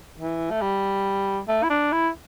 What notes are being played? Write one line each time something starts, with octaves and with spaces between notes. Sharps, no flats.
E3
A3
G3
A3
E4
D4
E4